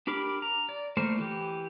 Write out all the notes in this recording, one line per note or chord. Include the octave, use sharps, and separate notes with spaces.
D4 G4 A#4 B5 D6
A#5
D5
E3 A3 A#3 A#4 C5
E3 G4